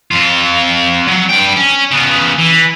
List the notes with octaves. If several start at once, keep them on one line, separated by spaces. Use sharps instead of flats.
F2 F4
F#3
G2 G5
C#4
C#3 B3
E3